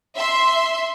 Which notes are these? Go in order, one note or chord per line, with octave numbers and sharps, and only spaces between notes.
E5 C6